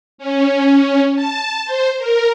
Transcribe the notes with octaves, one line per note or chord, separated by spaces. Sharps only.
C#4
A5
C5
A#4